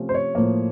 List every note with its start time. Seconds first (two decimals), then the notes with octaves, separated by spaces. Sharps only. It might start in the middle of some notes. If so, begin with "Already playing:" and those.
Already playing: C3 F3 A3 C#4
0.09 C5
0.14 C#5
0.35 A2 F3 A#3